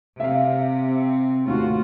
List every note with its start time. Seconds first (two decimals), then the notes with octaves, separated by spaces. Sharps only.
0.20 C3 E5 F5
0.86 C4
1.47 D#2 A2 F4 F#4